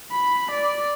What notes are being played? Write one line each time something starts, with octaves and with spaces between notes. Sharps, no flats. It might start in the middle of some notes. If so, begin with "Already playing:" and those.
B5
D5